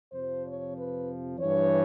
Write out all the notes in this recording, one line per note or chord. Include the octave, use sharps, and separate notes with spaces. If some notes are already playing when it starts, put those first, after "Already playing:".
F2 C3 F3 C5
C#5
B4
G2 E3 C#5